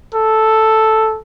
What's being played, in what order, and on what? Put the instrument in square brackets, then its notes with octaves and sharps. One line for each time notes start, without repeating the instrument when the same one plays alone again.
[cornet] A4